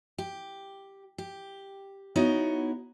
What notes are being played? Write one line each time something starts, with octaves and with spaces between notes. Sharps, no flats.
G4
G4
B3 D#4 E4 F#4 C#5